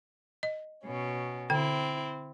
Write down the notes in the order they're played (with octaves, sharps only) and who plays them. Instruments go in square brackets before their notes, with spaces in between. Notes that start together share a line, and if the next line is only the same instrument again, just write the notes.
[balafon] D#5
[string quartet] B2 C#4
[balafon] D3 G5 [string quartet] C4 E4